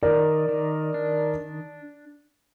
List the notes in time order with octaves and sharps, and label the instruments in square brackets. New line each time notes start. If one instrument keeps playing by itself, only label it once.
[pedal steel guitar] D#3 [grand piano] A#4 D5
[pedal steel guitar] D#3
D4